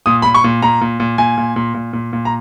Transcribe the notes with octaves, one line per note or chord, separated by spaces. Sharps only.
A#2 D#6
A#2 B5
C#6
A#2
A#2 A#5
A#2
A#2
A#2 G#5
A#2
A#2
A#2
A#2
A#2
A#5